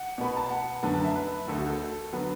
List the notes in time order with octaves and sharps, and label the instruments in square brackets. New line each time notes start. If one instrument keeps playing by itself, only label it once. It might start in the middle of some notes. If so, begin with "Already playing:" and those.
Already playing: [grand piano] F#5
B2 B3 B5
A5
F#5
F#2 D3 B3 A5
A5
E5
B4
D2 D3 A3 A4
F#4
A4
D3 F#3 B3 B4